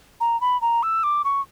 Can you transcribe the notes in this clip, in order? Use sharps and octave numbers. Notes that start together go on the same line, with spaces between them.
A#5
B5
A#5
E6
D6
C#6